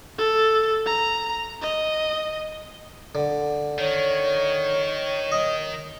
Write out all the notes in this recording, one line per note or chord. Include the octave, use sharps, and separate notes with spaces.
A4
A#5
D#5
D3
D#3 C#5
D#5